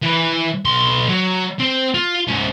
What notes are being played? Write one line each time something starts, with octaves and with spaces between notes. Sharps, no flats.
E3 B4
B1 C6
F#3
C4
F4
G#2 C#3